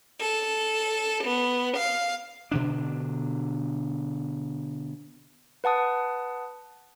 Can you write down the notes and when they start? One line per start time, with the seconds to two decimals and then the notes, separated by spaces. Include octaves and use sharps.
0.19 A4
1.23 B3
1.76 F5
2.51 B2 D3 D4
5.64 B4 F#5 A5 D#6